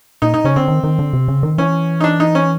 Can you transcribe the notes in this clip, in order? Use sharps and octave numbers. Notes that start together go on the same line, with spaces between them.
A#2 D#4
D#4
C#3 C#4
D3 C4
D#3
D#3
D3
C3
C#3
D#3
E3 C#4
D#4
D4
D#4
C#4